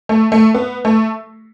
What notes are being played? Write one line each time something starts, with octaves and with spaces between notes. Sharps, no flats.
A3
A3
B3
A3